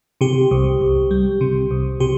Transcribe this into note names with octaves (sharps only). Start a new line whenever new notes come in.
C3 G4
C2
C2
G3
C3
C2
C3 G4